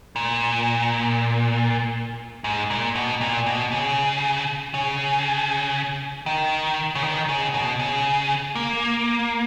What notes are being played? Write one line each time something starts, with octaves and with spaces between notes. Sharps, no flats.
A#2
G#2
A#2
B2
A#2
B2
C#3
C#3
D#3
C#3
D#3
C#3
B2
C#3
A#3